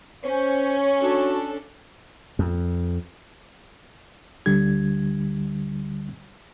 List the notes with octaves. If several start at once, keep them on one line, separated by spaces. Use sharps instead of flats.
C#4 C5 C#5
D4 F#4 A4
F2
D2 D3 G3 G#6